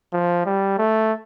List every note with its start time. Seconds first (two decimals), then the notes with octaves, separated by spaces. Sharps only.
0.13 F3
0.46 G3
0.78 A3